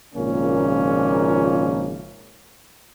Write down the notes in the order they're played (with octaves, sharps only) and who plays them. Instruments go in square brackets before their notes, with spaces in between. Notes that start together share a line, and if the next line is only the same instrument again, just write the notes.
[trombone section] G#1 A#2 C#3 F3 A#3 C#4